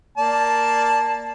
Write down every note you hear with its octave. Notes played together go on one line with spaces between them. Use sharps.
A#3 D5 A5